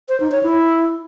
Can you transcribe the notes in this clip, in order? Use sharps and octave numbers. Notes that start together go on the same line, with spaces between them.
C5
D#4
C#5
E4